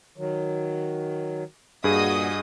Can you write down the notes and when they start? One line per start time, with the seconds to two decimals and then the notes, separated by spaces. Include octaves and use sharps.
0.17 D#3 F#3
1.84 G2 A#2 F#4 G#4 D#5 D#6